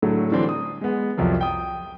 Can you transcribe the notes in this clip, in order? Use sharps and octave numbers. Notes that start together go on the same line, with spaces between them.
A2 D3 F#3 A3
D3 E3 F#3 G3 C4 D4
D#6
G#3 B3
C2 F2 F3 F#3
G5 D#6